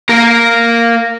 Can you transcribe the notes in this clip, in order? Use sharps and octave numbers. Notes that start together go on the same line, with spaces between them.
A#3 A#4